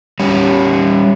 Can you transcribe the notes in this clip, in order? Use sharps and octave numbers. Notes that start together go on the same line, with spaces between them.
G3 C#4